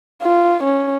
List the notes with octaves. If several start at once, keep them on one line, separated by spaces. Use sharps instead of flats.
F4
C#4